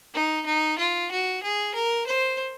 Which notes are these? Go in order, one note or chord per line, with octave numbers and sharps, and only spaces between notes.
D#4
D#4
F4
F#4
G#4
A#4
C5